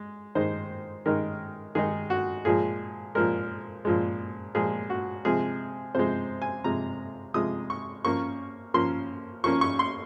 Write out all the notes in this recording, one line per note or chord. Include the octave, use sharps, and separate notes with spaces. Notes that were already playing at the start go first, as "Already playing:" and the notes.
Already playing: G#3
D#3 G#3 D#4 C5
D#3 G#3 D#4 A#4
D#3 G#3 D#4 G#4
F#4
A#2 F3 G#3 G#4
A#2 F3 G#3 A#4
A#2 F3 G#3
A#2 F3 G#3 G#4
F#4
C3 F3 G#3 G#4
C3 F3 G#3 C5
G#5
C3 F3 G#3 A#5
C3 F3 G#3 D#6
C#6
F3 A#3 C#4 C#6
F3 A#3 C#4 C6
F3 A#3 C#4 C#6
C#6
C6